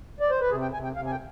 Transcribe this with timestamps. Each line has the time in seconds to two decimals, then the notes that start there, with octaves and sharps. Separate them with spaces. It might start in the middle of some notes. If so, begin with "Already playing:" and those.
0.20 D5
0.30 C5
0.40 B4
0.50 C3 G#4
0.62 G5
0.73 C3 G#5
0.84 G5
0.96 C3 F5
1.06 G#5
1.11 G5